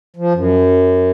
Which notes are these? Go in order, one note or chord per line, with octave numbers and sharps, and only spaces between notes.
F3
F#2